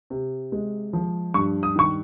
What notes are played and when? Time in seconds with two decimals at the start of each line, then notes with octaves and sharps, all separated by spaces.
0.10 C3
0.52 G#3
0.93 F3
1.34 G2 C#6
1.63 D#6
1.75 D#3 C#6